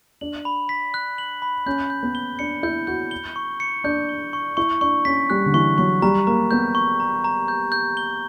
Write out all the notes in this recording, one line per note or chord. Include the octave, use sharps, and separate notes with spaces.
D4 F#7
B5
B6
F#6
F#7
B5
C#4 G6
G6
B3
G7
D4 C#7
E4 G6
F#4 G6
G7
C#6
C#7
D4 G6
G7
C#6
E4 C#6
D4 C#6
C#4 B6
G3 F#6
D3
E3 C#6
F#3 C#6
G3 A#5
A#3 A#5
B3 G6
C#6
A#5
A#5
G6
G6
G7